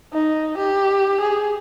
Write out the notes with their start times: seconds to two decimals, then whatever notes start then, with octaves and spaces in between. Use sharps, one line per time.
0.13 D#4
0.58 G4
1.20 G#4